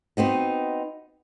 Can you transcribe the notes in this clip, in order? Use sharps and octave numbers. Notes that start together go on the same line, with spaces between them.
B3 C4 D#4 F#4